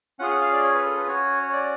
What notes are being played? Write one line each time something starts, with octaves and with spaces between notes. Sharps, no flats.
C#4 F4 G#4 F#5
F#5
F5
D5
C#5
B4
A4
B4
C#4 F#4 C#5
C#5
D5